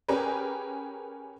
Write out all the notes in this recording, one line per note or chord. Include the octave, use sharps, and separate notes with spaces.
C#4 G4 G#4 A#4 B4